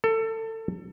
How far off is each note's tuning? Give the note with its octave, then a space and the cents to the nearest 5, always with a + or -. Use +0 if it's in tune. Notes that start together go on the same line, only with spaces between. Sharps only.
A4 +25